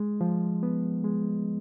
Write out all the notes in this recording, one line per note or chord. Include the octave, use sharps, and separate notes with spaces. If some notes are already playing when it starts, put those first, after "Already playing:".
Already playing: G#3
F3
B3
G#3